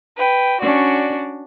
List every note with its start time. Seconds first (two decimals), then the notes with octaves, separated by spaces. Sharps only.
0.17 B4 G5
0.61 C#4 D4 F#4 D5